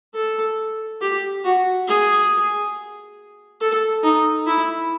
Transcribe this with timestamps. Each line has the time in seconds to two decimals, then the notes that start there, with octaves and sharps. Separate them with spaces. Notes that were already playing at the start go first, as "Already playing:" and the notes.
0.15 A4
1.01 G4
1.45 F#4
1.88 G#4
3.61 A4
4.03 D#4
4.47 E4